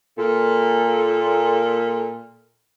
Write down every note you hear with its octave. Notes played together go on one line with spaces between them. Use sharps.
A#2 A4